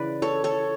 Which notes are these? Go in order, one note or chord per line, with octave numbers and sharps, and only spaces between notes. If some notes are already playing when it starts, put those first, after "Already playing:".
Already playing: C#3 E3 B4 D5
A4 C#5
A4 C#5